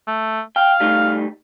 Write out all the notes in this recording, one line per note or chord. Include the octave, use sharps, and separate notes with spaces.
A3
F5 G5
G3 A3 D#4